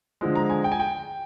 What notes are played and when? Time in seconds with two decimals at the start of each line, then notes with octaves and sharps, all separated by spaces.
0.21 D3 F3 G#3
0.35 A#5
0.50 G#5
0.64 G5
0.72 G#5
0.79 G5